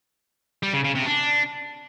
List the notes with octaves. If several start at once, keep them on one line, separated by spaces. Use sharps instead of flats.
G3
C#3
C#3
C3
D4